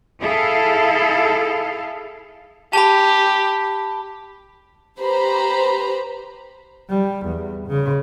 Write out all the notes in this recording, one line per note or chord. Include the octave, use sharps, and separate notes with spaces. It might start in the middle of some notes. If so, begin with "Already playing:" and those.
E4 G#4 A4 F5
G4 A5 B5
G4 B4 C5 A#5 B5
G3
E2
C#3